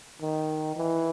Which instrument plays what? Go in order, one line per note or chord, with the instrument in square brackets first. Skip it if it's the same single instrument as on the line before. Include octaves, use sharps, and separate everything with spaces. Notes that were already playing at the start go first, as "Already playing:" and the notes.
[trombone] D#3
E3